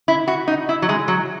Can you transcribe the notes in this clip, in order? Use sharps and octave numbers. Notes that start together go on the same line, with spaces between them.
E4
F#4
D#4
E4
F#3
G#3
F#3